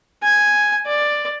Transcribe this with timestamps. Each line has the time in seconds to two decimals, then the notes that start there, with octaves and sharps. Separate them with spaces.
0.23 G#5
0.86 D5